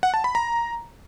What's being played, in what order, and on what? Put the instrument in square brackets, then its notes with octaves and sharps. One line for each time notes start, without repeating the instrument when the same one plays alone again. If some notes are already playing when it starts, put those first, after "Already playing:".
[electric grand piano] F#5
A5
B5
A#5